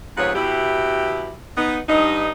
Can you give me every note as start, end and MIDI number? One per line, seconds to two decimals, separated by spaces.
0.17 0.32 44
0.17 0.32 48
0.17 0.32 53
0.17 0.32 59
0.17 0.32 73
0.17 0.32 78
0.35 1.35 47
0.35 1.35 64
0.35 1.35 67
1.57 1.79 59
1.57 1.79 63
1.89 2.30 43
1.89 2.30 63